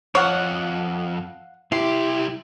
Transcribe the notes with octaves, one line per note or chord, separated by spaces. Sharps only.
F2 C#5 F5 F#5
C2 E4 G4 C6